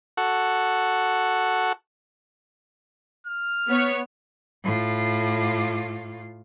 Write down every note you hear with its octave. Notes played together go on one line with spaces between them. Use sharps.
F#4 A4 F#5
F6
B3 C#5
A2 F4